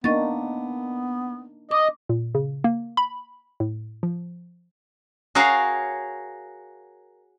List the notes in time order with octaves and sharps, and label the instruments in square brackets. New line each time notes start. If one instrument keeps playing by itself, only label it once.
[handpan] A#3 D4 D#4 [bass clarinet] B3 [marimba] D#5 C#6 A6
[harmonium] D#5 [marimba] D6
[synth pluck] A#2
C#3
A#3
B5
A2
F3
[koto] F#4 G#4 A#4 C#5 F5 F#5